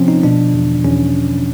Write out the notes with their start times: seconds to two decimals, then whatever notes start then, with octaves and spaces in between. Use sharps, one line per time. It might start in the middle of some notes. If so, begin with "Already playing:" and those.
Already playing: C3 F3 C4 C#4 F4
0.08 D#4
0.23 B2 D4
0.54 E2
0.84 E2 C#4